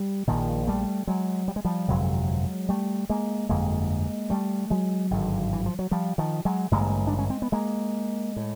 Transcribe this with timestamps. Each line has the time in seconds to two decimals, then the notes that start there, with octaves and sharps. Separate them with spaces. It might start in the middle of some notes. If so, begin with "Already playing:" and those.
Already playing: G3
0.27 A#1 A#2 D#3 F3
0.67 G3 A3
1.07 F#3 G#3
1.48 G3
1.56 G#3
1.65 F3 G3
1.88 G1 F2 C3 F#3 G#3
2.69 G3 A3
3.10 G#3 A#3
3.49 G1 F2 D3 G#3 A#3
4.30 G3 A3
4.70 F#3 G#3
5.11 G#1 G2 D3
5.53 E3
5.66 F3
5.79 F#3
5.91 F3 G3
6.18 D#3 F3
6.45 F#3 G#3
6.71 A1 G2 D3 G#3 A#3
7.07 D4
7.19 C#4
7.30 C4
7.42 B3
7.52 G#3 A#3
8.36 A2